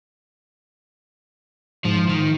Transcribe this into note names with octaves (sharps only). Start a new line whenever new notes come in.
G#2 F3
D#3